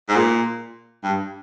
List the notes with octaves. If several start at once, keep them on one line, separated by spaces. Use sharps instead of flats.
G#2
A#2
G2